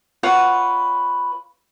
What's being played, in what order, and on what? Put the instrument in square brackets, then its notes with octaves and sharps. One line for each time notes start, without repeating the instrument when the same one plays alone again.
[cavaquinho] F4 B4 C#5 F#5